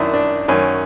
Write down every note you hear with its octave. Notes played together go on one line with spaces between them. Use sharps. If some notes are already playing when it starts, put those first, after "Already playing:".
Already playing: F#2 D#3 D4 E4
D4
F#2 D#3 C#4